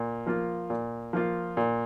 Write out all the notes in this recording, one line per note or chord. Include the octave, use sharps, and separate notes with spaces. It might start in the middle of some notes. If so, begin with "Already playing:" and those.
Already playing: A#2
F3 A#3 F4
A#2
F3 A#3 F4
A#2